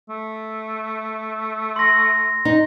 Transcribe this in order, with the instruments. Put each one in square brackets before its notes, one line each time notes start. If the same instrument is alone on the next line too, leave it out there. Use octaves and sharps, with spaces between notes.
[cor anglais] A3
[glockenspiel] C6 A#6
[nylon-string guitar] D#4